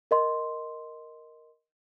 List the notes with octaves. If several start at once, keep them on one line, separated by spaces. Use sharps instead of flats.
A#4 D#5 C6